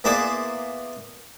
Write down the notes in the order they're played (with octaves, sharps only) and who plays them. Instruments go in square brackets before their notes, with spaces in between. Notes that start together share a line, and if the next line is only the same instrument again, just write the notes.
[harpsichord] A#3 B3 E4 G#4 C5 D5